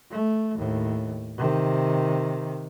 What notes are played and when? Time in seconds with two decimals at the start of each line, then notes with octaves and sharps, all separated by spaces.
0.11 A3
0.55 D#2 A2
1.37 C3 D#3